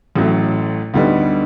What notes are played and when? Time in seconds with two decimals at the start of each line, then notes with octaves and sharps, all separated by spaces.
0.16 A1 A2 F#3 A3
0.94 D2 D3 G3 B3 D#4